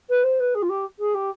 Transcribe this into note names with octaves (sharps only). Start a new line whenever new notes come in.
B4
C5
B4
G#4
F4
G4
G#4
G4